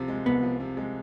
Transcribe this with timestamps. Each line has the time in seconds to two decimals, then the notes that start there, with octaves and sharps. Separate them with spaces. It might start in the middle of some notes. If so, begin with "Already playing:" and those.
Already playing: C2 C3 F3
0.08 G#3
0.26 C2 B3
0.43 F3
0.60 C3
0.77 G#3